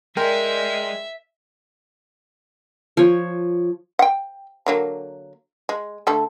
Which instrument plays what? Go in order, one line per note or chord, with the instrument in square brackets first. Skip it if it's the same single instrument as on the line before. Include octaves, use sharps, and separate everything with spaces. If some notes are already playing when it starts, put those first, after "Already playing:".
[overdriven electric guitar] G#3 [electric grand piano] A#4 G5 [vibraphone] D5 G#5 C6 [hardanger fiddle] E5
[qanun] F3 C#5
[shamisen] F#5 G5
D3 F#3 A#3
G#3
D3 A3 A4